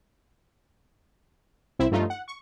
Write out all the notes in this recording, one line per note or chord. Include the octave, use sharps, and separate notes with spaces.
C2 C4 E4 E5
G2 F3 A3 D#4 F4
F#5
C#6